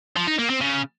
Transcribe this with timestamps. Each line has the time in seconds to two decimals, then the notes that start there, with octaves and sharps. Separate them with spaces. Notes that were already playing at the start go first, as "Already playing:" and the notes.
0.16 F3
0.28 D#4
0.39 A#3
0.50 C4
0.61 C#3